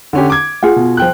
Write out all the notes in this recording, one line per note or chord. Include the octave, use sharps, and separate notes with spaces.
D3 C#4 G4
D6 G#6
F4 G#4 F#5
B2
F3 G5 F#6